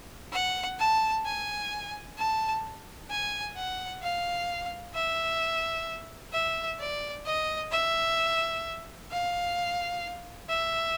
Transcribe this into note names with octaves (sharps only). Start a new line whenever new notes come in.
F#5
A5
G#5
A5
G#5
F#5
F5
E5
E5
D5
D#5
E5
F5
E5